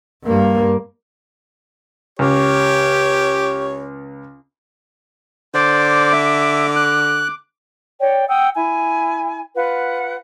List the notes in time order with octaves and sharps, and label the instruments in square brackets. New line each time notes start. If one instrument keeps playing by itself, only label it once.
[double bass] G2 A#3
[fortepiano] C#2 [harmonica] G4 C#5
[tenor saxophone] D3 [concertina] C5 D5 [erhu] D6
[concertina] E5
F#6
[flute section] C#5 D5 G5
F#5 G5 D#6 E6
E4 G#5
F4 B4 F#5